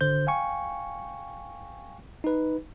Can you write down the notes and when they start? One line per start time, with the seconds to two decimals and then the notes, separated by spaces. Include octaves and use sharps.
0.01 G#1 D3 C5 G6
0.27 F5 G5 G#5 C#6
2.24 D#4 B4